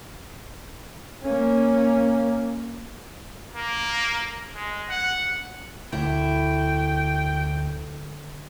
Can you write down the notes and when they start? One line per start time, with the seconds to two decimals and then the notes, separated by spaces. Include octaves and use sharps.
1.23 A#3 C#4
3.56 A#3
4.55 G#3
4.89 F#5
5.93 D2 E4 G5